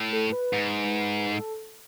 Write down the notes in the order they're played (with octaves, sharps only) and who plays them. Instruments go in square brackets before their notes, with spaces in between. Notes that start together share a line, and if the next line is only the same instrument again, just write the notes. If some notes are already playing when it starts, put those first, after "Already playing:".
Already playing: [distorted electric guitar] A2
[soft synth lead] A4
B4
[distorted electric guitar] G#2
[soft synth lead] A4